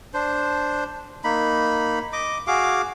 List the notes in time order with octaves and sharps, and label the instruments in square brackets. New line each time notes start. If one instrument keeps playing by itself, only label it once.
[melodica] D4 C5
A#3 D#4 B5
D#5 D6
F#4 G#4 F5 D6